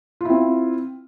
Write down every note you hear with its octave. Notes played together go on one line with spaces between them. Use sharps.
C4 E4 F4